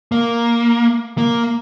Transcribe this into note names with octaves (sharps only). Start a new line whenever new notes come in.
A#3
A#3